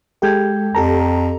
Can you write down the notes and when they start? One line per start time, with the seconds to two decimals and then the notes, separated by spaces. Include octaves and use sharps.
0.22 G#3 G4 A4 G5 G6 G#6
0.75 F2 G4 A4 A5 A#5